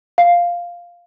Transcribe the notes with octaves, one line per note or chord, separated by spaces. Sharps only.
F5